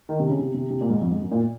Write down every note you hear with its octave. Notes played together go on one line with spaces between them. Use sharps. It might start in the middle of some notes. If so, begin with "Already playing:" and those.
D#3
C3
C#3
C3
C3
C3
A#2
G#2
F2
G#2
F#2
A#2